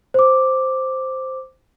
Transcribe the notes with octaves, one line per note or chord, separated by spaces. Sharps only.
C5 D6